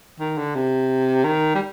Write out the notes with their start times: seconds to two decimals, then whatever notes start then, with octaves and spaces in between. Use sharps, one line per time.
0.20 D#3
0.38 D3
0.55 C3
1.24 D#3
1.55 G3